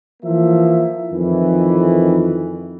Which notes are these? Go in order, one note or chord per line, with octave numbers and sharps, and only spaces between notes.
E3 F3 A#3 E5
F2 D#3 E3